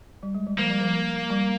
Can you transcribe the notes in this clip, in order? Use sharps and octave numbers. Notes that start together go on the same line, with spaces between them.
G3
G#3
G3
F3 A#3
G3
F3
G3